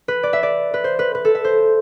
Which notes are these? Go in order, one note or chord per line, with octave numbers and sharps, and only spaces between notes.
B4
D5
E5
D5
B4
C5
B4
B4
A4
E5
C5